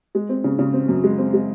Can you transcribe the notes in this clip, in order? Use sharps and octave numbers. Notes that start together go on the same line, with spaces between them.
G#3
C4
C#3
C#3
C4
F#2
G#3
C4
G#3